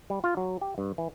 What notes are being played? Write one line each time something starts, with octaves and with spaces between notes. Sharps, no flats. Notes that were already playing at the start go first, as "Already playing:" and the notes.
G3
F4
F#3
G4
G2
E3